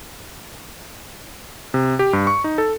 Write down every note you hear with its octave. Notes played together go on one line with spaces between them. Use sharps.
C3
G4
G2
C#6
D#4
A4